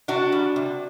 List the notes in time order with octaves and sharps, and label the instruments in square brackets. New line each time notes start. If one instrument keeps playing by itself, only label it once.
[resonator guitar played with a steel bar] C3 D4 F#4
G3
C3